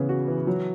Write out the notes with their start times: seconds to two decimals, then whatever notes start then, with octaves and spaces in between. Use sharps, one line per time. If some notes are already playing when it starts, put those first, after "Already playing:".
Already playing: C#3 E3 B3
0.09 F#4
0.28 E3
0.47 F#3